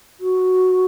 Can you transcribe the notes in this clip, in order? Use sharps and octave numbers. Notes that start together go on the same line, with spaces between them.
F#4